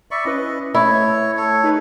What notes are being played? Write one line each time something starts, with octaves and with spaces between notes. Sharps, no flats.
D5 E5 B5 C#6
C#4 E4 B4 D#5
A3 E4 C#5
A4 C#5
D#4 G#4 B4